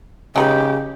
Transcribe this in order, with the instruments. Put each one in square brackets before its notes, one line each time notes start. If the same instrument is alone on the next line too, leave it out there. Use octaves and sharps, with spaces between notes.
[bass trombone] C#3 [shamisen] G#3 D#4 B4 [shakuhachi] G4